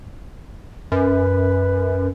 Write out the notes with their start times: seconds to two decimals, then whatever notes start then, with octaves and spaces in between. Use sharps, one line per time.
0.92 F#2 B4